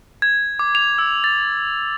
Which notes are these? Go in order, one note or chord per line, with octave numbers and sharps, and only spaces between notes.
G#6
D6
F7
E6
A6